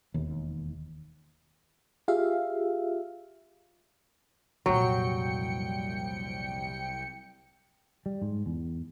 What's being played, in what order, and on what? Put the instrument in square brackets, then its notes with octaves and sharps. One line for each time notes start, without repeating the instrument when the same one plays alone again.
[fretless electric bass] E1 D#2
[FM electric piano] F4 G4 G#4 E5 F5
[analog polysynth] C2 G5 C#7 [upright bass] F2 A#2 [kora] F#3
[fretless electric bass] G3
G#2
E2